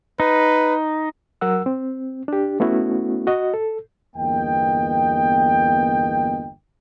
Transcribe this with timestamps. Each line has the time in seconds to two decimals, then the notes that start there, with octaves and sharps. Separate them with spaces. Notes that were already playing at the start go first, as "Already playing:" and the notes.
0.20 D#4 B4
1.41 F#3 A#4 F#5 E6
1.66 C4
2.28 D4 G4
2.60 A3 B3 C#4 E4 F#4
3.27 F#4 D#5
3.54 A4
4.16 G1 E2 A#3 B3 D#5 G5